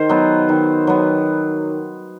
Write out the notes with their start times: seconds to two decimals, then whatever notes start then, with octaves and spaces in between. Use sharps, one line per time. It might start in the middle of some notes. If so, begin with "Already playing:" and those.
Already playing: D#3 C5
0.09 F#3 B3
0.49 D#3
0.87 F#3 B3